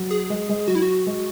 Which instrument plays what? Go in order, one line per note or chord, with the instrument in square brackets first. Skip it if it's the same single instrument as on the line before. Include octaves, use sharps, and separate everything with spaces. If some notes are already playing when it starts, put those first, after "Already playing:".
Already playing: [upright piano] F#3
[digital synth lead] G#4
[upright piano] G#3
G#3
[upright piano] F#3 [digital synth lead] F#4
[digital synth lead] E4
F#4
[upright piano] G#3